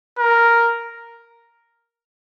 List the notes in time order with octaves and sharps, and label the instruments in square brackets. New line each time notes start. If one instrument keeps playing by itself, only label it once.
[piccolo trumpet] A#4